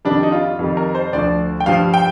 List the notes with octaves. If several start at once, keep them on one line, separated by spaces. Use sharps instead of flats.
F2 D#3 G3 D4
D#4
F4
F2 D#3 G3
A#4
C5
D2 D3 F3 D5
G5
G2 F3 F5
G5